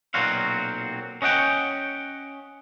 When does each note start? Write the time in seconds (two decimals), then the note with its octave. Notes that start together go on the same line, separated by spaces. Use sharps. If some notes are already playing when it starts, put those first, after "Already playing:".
0.14 B1 A#2 F#3 C4 F#4 F5
1.22 C#4 D#5 F#5 G5